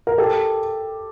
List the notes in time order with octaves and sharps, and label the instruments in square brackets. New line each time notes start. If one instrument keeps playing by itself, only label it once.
[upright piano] A#4
G4 A4